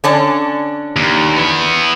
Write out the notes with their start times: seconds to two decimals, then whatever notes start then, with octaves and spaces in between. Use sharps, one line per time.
0.04 D3 C#4 D4
0.96 D#2
1.37 B3 E4